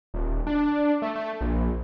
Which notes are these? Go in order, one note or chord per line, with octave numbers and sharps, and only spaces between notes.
D#1
D4
A3
A3
A#1